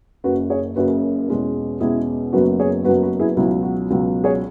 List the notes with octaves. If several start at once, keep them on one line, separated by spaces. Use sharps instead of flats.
F#1 F#2 C#3 F#4 B4
G#4 C#5
F#1 F#2 C#3 F#4 B4
E2 B2 G#3 C#4
E2 B2 G#3 C#4 E4 G#4
F#1 F#2 F#3 B3 F#4 B4
G#4 C#5
F#1 F#2 F#3 B3 F#4 B4
F#4 B4
E4 G#4
C#2 B2 F#3 E4
F#4
C#2 B2 F#3
G#4 C#5